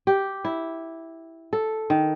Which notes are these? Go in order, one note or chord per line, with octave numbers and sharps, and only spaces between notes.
G4
E4
A4
D#3